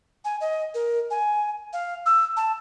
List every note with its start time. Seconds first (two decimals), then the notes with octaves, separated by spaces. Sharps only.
0.25 G#5
0.41 D#5
0.74 A#4
1.11 G#5
1.73 F5
2.06 E6
2.37 A5